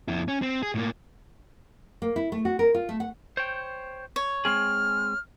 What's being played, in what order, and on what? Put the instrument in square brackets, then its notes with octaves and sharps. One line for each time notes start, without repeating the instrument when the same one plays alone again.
[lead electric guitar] F2 E4
C#4
C4
G#4
A2 A#3
[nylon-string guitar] A#3
E4
A3
F#4
A#4
F4
A3
F#5
[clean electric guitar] C5 C#5 G5
[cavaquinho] C#5
[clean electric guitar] G#3 C4 G#4 [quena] F6